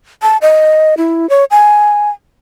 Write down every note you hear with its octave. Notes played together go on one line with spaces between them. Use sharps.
A5
D#5
E4
C#5
G#5